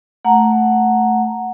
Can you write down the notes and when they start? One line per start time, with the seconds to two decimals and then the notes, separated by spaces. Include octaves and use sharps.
0.25 A3 F#5 A#5